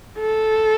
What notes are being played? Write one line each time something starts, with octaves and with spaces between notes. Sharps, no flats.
A4